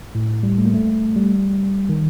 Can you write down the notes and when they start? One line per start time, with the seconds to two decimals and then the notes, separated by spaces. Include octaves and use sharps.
0.15 A2
0.43 G3
0.58 A3
0.65 A#3
0.74 A3
1.16 G3
1.89 D#3